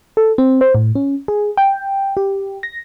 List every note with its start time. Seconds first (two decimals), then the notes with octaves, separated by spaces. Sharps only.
0.17 A4
0.38 C4
0.61 C5
0.75 A2
0.95 C#4
1.28 G#4
1.57 G5
2.17 G4
2.63 A#6